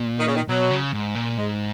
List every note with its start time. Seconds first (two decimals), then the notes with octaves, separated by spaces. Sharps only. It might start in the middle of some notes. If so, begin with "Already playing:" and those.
Already playing: A#2
0.19 D#3
0.27 C#3
0.35 D#3
0.48 B2 F#3
0.71 C#3
0.93 G#2
1.15 A#2
1.37 G#2 G#3